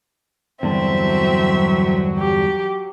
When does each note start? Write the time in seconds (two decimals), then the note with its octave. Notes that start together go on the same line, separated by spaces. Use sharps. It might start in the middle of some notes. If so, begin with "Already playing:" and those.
0.63 E2 G2 D3 F#3 C4 E5
2.18 G4